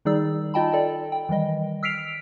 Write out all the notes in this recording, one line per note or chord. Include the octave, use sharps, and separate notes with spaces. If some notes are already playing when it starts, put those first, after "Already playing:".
D#3 G3 D#4 G#4 D5 E6
D#4 F4 D#5 G5 A5 B5
A4 D5
G5
D#3 E3 G3 D#5
E6 F6 B6 C7 D7 F7